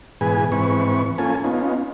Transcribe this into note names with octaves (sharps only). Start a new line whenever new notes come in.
G#2 B2 E3 G#4 B4 G#5
G#2 E3 C4 B4 C#6
A#3 C#4 F4 A4 G#5
B3 C#4 D#4 F4